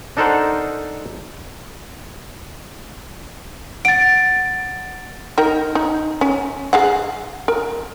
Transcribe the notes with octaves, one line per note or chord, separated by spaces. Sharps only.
D4 D#4 A4 A#4 C5 F#5
F#5 A6 D7
D#4 A#4 G5
D#4
C#4
G#4 F5 F#5
A#4